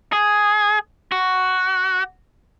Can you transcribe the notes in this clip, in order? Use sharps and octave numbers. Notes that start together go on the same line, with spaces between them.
G#4
F#4